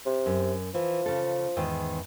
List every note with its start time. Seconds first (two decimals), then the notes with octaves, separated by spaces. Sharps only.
0.06 C3
0.26 F#2
0.74 E3 F3
1.06 C#3 A4
1.57 E2 G#2 D#3